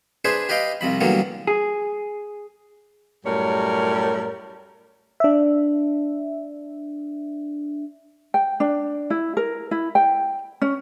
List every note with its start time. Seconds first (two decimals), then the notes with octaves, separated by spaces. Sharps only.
0.25 D4 G#4 B4 C5 E5
0.49 G4 B4 D#5 F5 G5
0.81 C2 C3 F3 B5
1.01 D3 E3 F#3 G3 A#3 B3
1.47 G#4
3.25 F#2 A2 G3 A#4 C#5
5.20 D4 E5
8.34 G5
8.60 D4
9.10 E4
9.37 A#4
9.71 E4
9.95 G5
10.62 C#4